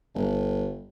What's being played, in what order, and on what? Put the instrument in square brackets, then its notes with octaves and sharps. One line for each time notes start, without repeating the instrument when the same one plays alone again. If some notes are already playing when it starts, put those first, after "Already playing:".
[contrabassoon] G1